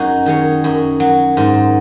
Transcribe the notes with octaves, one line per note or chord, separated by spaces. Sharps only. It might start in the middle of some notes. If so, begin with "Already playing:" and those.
Already playing: F#2 F#3 D#4 F#4 G#4
D#3 G#4 C#5
F#2
F#3
G#2